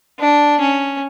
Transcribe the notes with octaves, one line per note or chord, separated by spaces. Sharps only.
D4
C#4